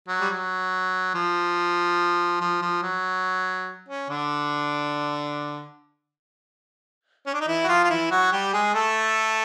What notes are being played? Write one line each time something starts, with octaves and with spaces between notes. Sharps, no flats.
F#3
G3
F#3
F3
F3
F3
F#3
C#4
D3 D4
C#4
D4
D#4
E3 E4
F#4
F3 F4
F4
E3 E4
F#3 F#4
G3 G4
G#3 G#4
A3 A4